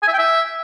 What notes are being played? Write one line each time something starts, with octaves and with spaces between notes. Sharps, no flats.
G#5
E5
G5
E5